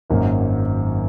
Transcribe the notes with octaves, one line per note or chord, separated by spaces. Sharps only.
G#1 F#2 D#3 F#3 A#3